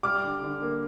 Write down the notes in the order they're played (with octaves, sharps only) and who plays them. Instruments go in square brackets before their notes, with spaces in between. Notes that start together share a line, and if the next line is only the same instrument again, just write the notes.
[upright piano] G3 D6 F6
D3
D3
A#3